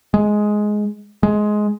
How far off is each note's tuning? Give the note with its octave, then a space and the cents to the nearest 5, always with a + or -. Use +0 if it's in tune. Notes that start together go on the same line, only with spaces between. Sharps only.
G#3 +10
G#3 +15